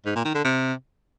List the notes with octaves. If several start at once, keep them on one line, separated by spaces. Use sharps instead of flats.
G#2
A#2
D#3
D3
C3